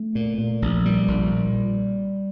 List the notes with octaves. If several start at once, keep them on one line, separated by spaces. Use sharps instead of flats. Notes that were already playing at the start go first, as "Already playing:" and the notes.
Already playing: A3
A#2
A#2
A#1
A#2 G3
A#1
A#2